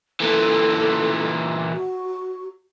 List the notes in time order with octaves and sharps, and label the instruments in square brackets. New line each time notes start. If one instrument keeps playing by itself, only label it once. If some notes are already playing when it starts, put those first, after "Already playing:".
[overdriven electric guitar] A#2 E3 [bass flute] A4
[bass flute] F#4